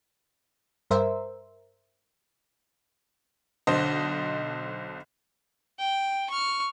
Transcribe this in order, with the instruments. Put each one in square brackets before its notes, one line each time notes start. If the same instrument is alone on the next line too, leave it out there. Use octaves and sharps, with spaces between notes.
[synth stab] G2 A#4 C5 E5
[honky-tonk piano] B1 D3 C5 D#5 A5
[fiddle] G5
C#6 F6